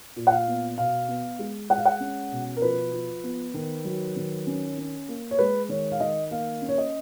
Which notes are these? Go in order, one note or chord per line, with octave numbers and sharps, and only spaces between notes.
A#2
F#5
F5
B3
B2 F5
B3
G#3
G#3 F#5
F5
F#5
C#4
B2
A#4
F3 B4
F3
B3
D#3
F#3
D#3
C#4
C#4
A#3
C#5
G#3 B4
D#3 C#5
F5
D#3 D#5
A#3 F5
C#4
C#5
D#5